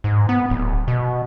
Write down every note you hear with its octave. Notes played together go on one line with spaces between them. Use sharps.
G#2
B3
D1
B2